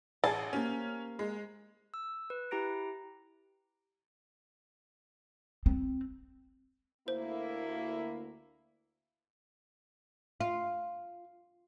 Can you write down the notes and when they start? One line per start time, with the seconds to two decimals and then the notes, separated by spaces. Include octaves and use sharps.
0.24 A1 G#4 A5
0.53 A#3 C#4 G4 C5
1.19 G#3
1.94 E6
2.30 B4
2.51 E4 G4 A#5 A#6 D7
5.66 C4
7.08 D2 A#3 E4 C5
10.40 F4